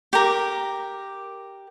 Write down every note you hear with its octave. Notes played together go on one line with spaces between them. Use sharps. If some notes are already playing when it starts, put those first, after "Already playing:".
G4 A#4